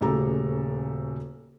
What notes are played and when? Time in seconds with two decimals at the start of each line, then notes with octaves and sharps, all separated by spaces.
0.01 D#1 D2 C#3 G4 A4 A#5